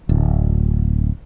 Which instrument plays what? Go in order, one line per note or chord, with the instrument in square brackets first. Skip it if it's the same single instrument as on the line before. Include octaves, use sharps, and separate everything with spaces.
[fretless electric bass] D1